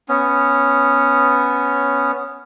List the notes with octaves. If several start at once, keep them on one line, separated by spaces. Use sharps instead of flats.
B3 C#4